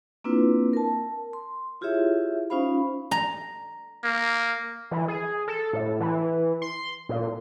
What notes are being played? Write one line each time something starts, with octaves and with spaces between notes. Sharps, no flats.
A#3 C4 D4 E4 F4 B4
A#4 A5
C6
E4 F4 G4 G#4 C#5 E5
C#4 D#4 F4 C5 F5 B5
A#5
A#3
E3
G#4
A4
A2
E3
C6
A#2